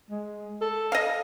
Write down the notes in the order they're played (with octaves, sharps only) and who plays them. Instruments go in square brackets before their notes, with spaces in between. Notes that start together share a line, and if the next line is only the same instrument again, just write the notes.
[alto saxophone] G#3
A4
[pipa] D#5 F5